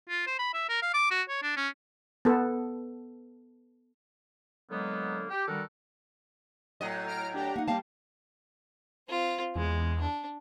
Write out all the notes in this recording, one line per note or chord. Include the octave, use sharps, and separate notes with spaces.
F4
C5
B5
E5
A#4
F5
D6
F#4
C#5
D4
C#4
B3 A4
D3 F#3 G#3 A#3 B3
G4
D3 D#3 G3 F#4 A4 A#4
A2 F#3 D#5
A#5 F6 D7
D4 G4 G5 A#5
A#3 D#4 F#5
G3 A#3 F5 G5 A5
C4 F4
E2 G#3
D4